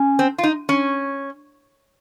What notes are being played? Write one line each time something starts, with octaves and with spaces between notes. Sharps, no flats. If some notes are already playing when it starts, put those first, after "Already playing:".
Already playing: C#4
C4
F4
D#4
C#4